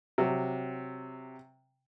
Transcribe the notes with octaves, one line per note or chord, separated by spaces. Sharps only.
C3 F#3